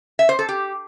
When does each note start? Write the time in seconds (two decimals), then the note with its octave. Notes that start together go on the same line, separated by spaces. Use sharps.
0.19 E5
0.29 C5
0.39 A4
0.49 G4